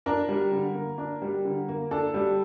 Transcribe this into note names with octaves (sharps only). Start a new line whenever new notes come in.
D4 A#4
G3
D3
A#3
D4
G3
D3
A#3
D4 A4
G3